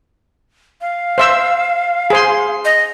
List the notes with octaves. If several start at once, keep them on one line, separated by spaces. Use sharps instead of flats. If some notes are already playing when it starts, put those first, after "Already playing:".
F5
C5 E5 E6
G#4 C5 C6
D#5